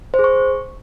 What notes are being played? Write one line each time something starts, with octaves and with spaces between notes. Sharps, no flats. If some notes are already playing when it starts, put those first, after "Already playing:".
C5
G#4
C#6